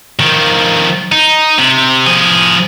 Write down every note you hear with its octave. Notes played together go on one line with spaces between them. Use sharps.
D#3 F3
D#4
C3
F3 G#4